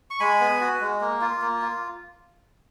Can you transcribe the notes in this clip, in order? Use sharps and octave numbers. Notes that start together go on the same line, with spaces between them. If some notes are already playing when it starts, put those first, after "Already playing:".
C#6
G#3 G#5 B5
B3
F#4
G#3
A#3
F4
A#3
F4